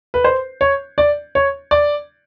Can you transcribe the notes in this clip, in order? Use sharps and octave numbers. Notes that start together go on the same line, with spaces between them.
B4
C5
C#5
D5
C#5
D5